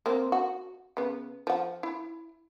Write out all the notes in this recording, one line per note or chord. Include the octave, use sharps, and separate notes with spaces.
A#3 C4
F#4
C#3 B3
F3 F#5
E4